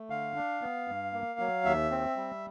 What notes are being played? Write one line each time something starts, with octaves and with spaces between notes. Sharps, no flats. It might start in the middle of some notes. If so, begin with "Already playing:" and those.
Already playing: A3
D3 F5
D4
B3
G2
A#3
F#3
D#2 E5
C4
G3